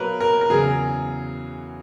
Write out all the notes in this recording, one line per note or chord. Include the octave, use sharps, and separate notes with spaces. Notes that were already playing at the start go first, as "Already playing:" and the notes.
Already playing: B2 F#3 A#3 A#4 B4 C#5
A#4
A#4
E2 C#3 F#3 G#4